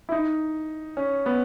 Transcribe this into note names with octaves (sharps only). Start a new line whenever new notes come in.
E4
D#4
C#4
B3